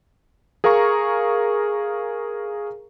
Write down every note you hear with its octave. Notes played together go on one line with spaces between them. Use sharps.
G#4 A#4 F5 A#5 C#6